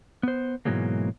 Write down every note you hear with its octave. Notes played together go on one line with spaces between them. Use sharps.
B3 C5
G#2 B2 E3 F#3 G#3 A#3